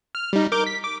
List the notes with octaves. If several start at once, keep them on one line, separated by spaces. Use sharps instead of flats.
F6
G3 D#4
A#4 D6 G6
B6
D6